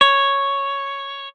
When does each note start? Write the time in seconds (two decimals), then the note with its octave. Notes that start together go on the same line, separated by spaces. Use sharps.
0.01 C#5